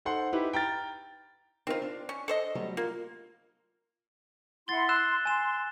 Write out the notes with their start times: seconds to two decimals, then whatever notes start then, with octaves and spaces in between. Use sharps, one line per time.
0.05 D#4 A4 C5 F#5 C6
0.32 D#4 E4 G4 B4
0.53 G5 A#5 F6 A6
1.67 C4 D#4 F4 A#4 C5
1.82 D4
2.09 C#4
2.28 A4 C5 D#5
2.55 F#3 G3 A3
2.77 A#3 F4
4.68 E4 F#5 C6 A6 G7
4.89 C6 E6 F#6 E7
5.25 G#5 C6 E7